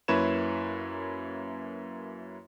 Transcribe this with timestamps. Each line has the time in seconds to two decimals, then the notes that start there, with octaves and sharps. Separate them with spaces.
0.08 F#2 A#3 E4 B4 C#5 E7